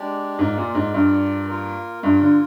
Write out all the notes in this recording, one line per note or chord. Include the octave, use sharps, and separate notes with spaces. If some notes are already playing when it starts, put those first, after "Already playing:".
Already playing: G#3 D4 G4 D5
G#2 F4 A#4 D5
A#2
G#2
G2 F4 A#4 D5
A#3 F4 A#4
G2 A#3 F4 A#4
D3